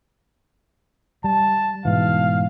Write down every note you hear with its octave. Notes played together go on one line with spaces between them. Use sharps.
G3 A5
G#2 B2 E3 F5